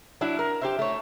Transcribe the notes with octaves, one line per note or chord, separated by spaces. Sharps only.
F#3 D4 E4
A#4
G4 C5 E5
A3 C#5